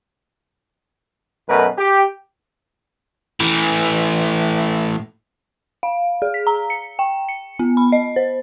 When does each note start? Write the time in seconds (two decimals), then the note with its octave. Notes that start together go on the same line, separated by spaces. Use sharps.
1.48 F#2 B2 A3 A#4 B4
1.78 G4
3.40 A2 E3
5.83 F5
6.22 G#4
6.34 B6
6.47 A#5
6.70 C#7
6.99 G5
7.29 C#7
7.59 B3
7.77 B5
7.92 D#5
8.16 C5